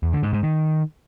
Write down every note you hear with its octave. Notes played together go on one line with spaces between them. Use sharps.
E2
D3
G#2
G#2
D#3